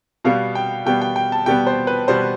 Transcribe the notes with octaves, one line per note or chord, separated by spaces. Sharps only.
B2 G3 B3 F5
G5
B2 G3 B3 G5
G5
G5
A5
B2 G3 B3 G5
C5
B4
B2 G3 B3 C5